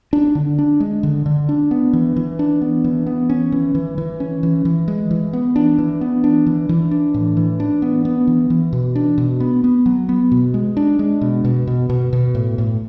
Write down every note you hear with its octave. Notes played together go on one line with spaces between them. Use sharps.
D4
D3
D4
G#3
D3
D3
D4
B3
E3
E3
D4
B3
E3
B3
C#4
E3
E3
E3
C#4
E3
E3
G#3
E3
B3
D4
E3
B3
D4
E3
E3
D4
A2
E3
D4
B3
B3
E3
E3
B2
D4
B2
B3
B3
F#3
B3
B2
G#3
D4
G#3
B2
B2
B2
B2
B2
A2
A2